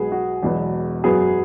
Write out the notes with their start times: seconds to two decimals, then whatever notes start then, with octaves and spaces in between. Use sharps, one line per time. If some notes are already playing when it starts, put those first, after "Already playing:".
Already playing: B1 B2 G#3 B3 G#4
0.12 F#4
0.43 E1 E2 B2 F#3 B3
1.04 F#2 F#3 B3 G#4